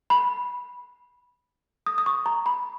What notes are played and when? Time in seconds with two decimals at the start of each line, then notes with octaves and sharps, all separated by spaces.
0.10 B5
1.86 D#6
1.98 D#6
2.06 C#6
2.26 A#5
2.46 B5